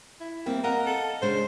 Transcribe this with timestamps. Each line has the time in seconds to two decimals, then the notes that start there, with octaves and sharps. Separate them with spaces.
0.20 E4
0.46 G3 A#3 C4
0.64 A#4 D#5 F5 F#5
0.86 A4
1.22 C#3 G#3 D4 C5